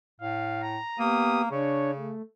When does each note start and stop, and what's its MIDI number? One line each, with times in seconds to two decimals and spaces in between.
0.20 0.78 45
0.20 0.61 77
0.62 0.99 82
0.99 1.47 58
0.99 1.42 59
0.99 1.42 67
0.99 1.42 87
1.51 2.13 49
1.51 1.91 62
1.51 1.91 73
1.96 2.22 57